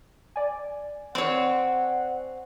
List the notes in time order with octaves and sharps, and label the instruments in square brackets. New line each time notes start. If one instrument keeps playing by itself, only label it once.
[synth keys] D5 G#5
[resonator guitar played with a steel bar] C4 C#5 [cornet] F#5